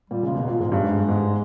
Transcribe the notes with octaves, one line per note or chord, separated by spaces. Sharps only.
A#2 G3
C#3 G#3
B2
A#2 A#3
G#2 G#3
G2
G#2
G2
G#2